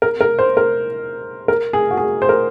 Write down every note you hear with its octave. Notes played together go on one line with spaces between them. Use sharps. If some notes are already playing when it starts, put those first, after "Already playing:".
A#4
A#4
C5
A#4
A#4
G#4
F#4
G#4
C5
A#4